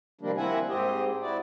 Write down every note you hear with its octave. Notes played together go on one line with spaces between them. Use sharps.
C3 D#3 F3 G3 A#3 D4
A#3 C4 E4 E5 F#5 G#5
G#2 C4 G4 D#5
E4 F#4 D5